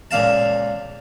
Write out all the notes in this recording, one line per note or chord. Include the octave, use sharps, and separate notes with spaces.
C#2 A#2 F5 A5